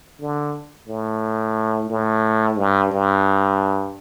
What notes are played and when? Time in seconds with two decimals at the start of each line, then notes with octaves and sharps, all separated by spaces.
0.20 D3
0.88 A2
1.90 A2
2.58 G2
2.92 G2